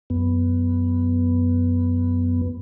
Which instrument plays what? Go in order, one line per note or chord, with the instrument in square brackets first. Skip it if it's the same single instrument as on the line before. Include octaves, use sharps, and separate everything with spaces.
[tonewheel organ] F#2 B3